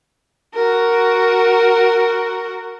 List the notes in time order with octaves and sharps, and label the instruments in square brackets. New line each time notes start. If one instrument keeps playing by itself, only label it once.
[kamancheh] F#4 A#4